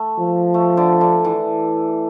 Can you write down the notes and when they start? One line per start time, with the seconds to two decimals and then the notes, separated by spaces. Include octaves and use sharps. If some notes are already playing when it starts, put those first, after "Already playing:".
Already playing: A3
0.18 F3
0.54 A3
0.77 D3
1.01 D3
1.24 E3